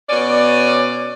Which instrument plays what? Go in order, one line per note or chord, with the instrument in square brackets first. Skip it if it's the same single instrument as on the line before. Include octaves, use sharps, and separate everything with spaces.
[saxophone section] B2 C#4 D5